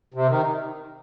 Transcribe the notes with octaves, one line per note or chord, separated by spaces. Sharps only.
C3
D#3